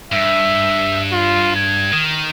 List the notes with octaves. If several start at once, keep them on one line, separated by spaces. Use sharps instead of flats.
G2 E5
F4
G#6
D#3